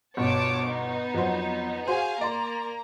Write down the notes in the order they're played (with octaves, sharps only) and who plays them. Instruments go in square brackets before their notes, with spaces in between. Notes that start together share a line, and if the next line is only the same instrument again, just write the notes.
[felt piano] G1 B2 [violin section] C#5 A5 D6
[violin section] B3 D#4
[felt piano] F2 F#3 C5
[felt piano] F#4 C5 [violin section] G#4 F5 G#5
[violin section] A#3 A#5 [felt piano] D5 C6